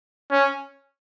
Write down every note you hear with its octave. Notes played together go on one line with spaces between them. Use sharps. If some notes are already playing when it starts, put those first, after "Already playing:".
C#4